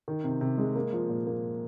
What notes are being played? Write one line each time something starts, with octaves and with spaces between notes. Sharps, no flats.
D#3
C3
C3
G#3
A#3
F3
A#2
A#3